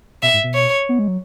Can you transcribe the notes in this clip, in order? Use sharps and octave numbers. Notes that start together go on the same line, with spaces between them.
B2 E5
G#2
B2
C#5
B3
G#3
F#3